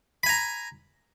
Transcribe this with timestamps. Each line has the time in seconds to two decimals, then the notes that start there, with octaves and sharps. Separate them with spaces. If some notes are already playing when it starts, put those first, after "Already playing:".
0.23 B5
0.26 G#5
0.29 A#5